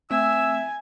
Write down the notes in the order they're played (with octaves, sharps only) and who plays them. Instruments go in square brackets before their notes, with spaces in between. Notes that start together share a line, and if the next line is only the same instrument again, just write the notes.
[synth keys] A3 C4 E7 [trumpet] E5 [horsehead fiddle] G#5 [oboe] E6